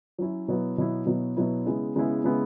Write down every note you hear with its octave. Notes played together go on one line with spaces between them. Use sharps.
F#3 C#4 E4
B2 F#3 B3 E4
B2 F#3 B3 E4
B2 F#3 B3 E4
B2 F#3 B3 E4
C#3 G#3 B3 E4
C#3 G#3 B3 E4
C#3 G#3 B3 E4